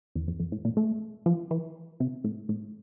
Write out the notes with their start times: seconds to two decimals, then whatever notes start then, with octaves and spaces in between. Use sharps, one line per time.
0.15 E2
0.28 F2
0.40 F2
0.52 A2
0.65 A#2
0.77 A3
1.26 F3
1.51 E3
2.00 C3
2.24 A2
2.49 A2